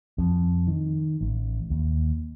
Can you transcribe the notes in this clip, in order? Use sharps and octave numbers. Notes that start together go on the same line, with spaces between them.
F2
D#3
A1
D#2